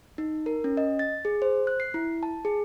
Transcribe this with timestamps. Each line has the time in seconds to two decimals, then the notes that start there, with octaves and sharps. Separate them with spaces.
0.18 D#4
0.46 A#4
0.64 C#4
0.77 D#5
0.99 A6
1.25 G#4
1.42 C5
1.67 F#6
1.80 C7
1.94 E4
2.23 A5
2.45 G#4